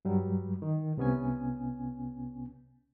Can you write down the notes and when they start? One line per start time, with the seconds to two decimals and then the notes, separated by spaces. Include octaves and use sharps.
0.05 G2 F#3 G3
0.62 D#3
0.97 C2 C3 B3 C#4 G#5